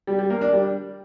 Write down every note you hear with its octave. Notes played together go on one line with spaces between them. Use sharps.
G3
G3
A#3
D4
G3